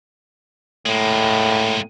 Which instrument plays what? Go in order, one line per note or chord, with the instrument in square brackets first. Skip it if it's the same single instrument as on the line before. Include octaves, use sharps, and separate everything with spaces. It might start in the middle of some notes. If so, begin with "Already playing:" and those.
[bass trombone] A2 [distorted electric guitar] G#3 A#3